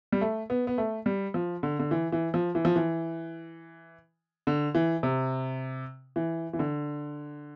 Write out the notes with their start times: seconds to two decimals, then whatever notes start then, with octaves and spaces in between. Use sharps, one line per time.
0.12 G3
0.21 A3
0.50 B3
0.67 B3
0.78 A3
1.06 G3
1.34 F3
1.63 D3
1.79 D3
1.91 E3
2.12 E3
2.34 F3
2.55 E3
2.65 F3
2.76 E3
4.47 D3
4.75 E3
5.03 C3
6.16 E3
6.53 E3
6.59 D3